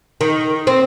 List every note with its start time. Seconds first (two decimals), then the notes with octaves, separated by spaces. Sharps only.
0.21 D#3
0.67 C4